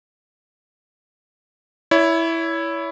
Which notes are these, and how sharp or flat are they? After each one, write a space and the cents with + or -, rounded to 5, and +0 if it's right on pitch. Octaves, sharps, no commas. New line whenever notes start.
E4 +0 C#5 +30